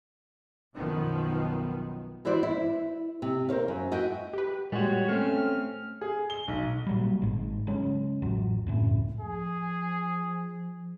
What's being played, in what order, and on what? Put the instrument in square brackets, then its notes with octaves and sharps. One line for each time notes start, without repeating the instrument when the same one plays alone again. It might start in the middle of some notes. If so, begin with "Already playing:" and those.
[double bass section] B1 F#2 D#3 F3 B3
[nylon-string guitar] E3 E4 F#4 C5 D5
E4
C3
A#4 C5 C#5 F5
F#2
F#4 D#5 E5 F#5 G5
[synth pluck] G4 B4
[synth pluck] A#2 G#3 [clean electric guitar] G3 F#4 [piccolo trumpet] C#5
[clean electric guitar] A3 C4 C#4 [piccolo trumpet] F6
[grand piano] G#4
G7
B1
[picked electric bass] A#2 F#3 G3
G#1 G#2
C#3 F#3 G#3 C#4
A1 F2 F#3
C#2 F#2 A2
[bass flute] F3 [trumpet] G#4